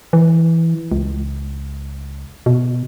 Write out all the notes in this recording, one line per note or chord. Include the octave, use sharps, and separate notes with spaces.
E3
C#2
B2